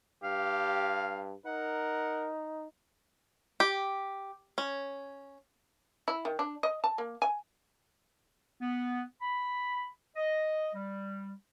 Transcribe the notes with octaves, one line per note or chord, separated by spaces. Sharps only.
G2 G4 F5
D#4 A#4 F#5
G4
C#4
E4
D#3
D4
D#5
A5
A#3
G#5
B3
B5
D#5
G3